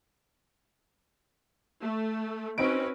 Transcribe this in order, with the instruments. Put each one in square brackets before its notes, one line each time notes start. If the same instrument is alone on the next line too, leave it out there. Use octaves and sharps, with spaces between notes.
[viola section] A3
[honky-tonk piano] C4 D#4 D7 [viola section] C#4 F#4 B4